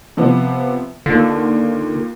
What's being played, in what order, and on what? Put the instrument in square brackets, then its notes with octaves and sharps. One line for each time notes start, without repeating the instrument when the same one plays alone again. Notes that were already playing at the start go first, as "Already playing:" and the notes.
[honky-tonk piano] C3 F3 B3
[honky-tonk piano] D#2 F4 [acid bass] D3